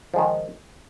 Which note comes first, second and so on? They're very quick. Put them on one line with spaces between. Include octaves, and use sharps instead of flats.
F3 G#3 D#3